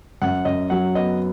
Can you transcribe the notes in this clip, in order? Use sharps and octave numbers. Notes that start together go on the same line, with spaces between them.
F#2 F#5
F#2 D#5
F#3 F#5
B3 D#5